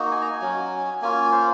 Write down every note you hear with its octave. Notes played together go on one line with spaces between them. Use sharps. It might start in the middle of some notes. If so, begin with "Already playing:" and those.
Already playing: A#3 D#4 F#4
G#5
A#5
G#5
F#3 C#4 F#4
A#3 C#4 F4 G#5
C5